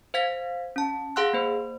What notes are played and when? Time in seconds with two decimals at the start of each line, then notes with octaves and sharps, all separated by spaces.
0.14 C5 F5 G#6 B6
0.76 C#4 A5
1.16 G#4 F5 F#5 C6 E6 F#6
1.33 A#3 C5